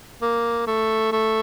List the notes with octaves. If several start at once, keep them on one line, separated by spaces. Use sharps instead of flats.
A#3
A3
A3